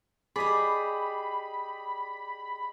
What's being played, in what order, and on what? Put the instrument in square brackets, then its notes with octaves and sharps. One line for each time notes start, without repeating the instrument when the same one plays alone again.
[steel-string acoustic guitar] G4 G#4 [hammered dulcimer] D5 D#5 [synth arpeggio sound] B5